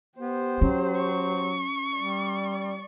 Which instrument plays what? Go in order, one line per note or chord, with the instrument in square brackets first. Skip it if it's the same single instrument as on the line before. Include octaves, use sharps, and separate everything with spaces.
[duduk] B3 [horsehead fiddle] G4 C5
[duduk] F#3 [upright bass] C#4
[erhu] C#6
[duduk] G3 [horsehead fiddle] D5